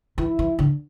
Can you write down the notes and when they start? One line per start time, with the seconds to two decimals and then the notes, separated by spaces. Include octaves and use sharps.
0.18 E3 E4
0.39 E3
0.59 D3